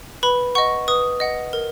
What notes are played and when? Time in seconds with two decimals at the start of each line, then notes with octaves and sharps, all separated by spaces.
0.23 B4 B5
0.55 D#5 F#5 C#6
0.88 B4 D#6
1.20 D#5 F#5
1.53 A#4